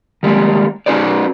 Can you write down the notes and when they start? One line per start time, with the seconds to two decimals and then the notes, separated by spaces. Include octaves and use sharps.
0.23 D#3 G3 G#3 A#3
0.86 C#4 D#4 F#4 B4 C5 D5